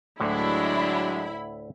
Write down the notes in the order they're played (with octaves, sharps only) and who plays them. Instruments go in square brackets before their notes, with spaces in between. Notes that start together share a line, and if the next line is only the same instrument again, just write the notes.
[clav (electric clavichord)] D2 A2 D3 [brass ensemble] F#3 G#3 D4 [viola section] E4 B5